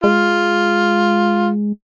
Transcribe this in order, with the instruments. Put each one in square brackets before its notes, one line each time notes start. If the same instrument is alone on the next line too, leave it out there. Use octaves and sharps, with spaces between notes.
[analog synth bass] G#3 [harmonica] F4